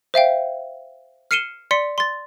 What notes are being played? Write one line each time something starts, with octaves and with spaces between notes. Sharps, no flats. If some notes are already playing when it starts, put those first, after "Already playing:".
C5 E5 F5 G5
F6 C7 C#7 D#7 E7 G7
D5 C6 B6 C#7
C6 A6